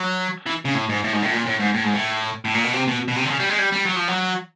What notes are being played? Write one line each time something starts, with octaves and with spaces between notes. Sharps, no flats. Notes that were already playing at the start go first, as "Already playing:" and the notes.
Already playing: F#3
E3
C#3
A2
G#2
A2
G#2
A2
A#2
A2
G#2
A2
G#2
A2
A2
A#2
B2
C3
B2
B2
C3
D3
C#3
G3
G#3
G3
G3
F#3
F3
F#3